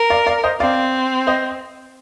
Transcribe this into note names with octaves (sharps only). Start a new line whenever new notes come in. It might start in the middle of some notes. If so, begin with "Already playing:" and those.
Already playing: A#4
D5 F5
D5 F5
C5 D#5
C4 D5 F5
C5 D#5